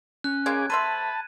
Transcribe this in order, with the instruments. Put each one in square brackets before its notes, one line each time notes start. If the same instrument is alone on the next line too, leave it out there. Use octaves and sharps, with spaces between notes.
[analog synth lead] C#4 [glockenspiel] F#6
[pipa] C#3 G#3 A#3 [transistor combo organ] G#4 G#5 D6 [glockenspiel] G#6
[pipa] A3 C5 E5 [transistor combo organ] A5 [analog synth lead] B5 [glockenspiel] D#7